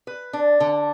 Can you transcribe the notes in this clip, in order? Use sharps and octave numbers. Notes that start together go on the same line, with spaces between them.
B4
D4
D3